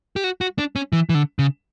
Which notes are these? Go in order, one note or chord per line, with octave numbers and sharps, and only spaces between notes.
G4
F#4
F#4
D4
C#4
E3
E3
D3
C#3